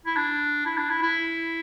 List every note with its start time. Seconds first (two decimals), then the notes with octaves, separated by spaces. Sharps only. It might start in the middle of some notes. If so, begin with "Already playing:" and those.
0.06 E4
0.16 D4
0.66 E4
0.78 D4
0.90 E4
1.02 E4